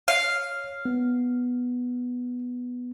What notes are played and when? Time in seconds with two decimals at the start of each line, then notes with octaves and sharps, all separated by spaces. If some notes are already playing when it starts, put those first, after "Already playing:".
0.08 C#5 F5
0.85 B3